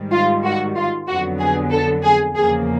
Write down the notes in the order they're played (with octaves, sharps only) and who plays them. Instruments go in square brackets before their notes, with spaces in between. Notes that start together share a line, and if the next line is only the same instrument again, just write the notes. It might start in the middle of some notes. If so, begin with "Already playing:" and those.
Already playing: [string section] G#2 D#3 G3
F4
F#4
F4
F2 D3 F#3 B3 F#4
G#4
A4
G#4
E2 C#3 F3 A#3 G#4